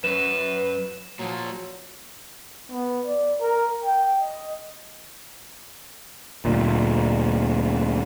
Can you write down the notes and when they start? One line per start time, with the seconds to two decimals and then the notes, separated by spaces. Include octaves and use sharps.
0.04 F#2 F#3 B4 E7
1.19 A#2 F3 F#3
2.71 B3
3.06 D5
3.41 A#4
3.84 G5
4.22 D#5
6.45 D2 A#2